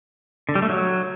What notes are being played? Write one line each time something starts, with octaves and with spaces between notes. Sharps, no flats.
D3
G3
A3
F#3